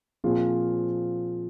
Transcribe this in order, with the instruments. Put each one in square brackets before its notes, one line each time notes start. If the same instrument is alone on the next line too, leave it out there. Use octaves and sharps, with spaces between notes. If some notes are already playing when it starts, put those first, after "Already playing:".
[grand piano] A#2 F3 C4 F4 G#4